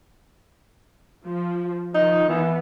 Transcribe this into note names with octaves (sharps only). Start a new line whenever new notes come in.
F3
D#3 F3 D#4
E3 B3